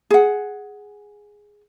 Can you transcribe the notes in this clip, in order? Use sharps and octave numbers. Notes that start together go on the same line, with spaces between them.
G#4 F#5